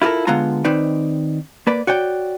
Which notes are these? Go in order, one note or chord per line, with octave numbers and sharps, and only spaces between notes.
E4 F4 G4 A4 A#4
D3 G#3 B3 F4 A#5
D#3 C4 D#4 B4 D5
A#3 B4 D5
F#4 C#5 D5 G5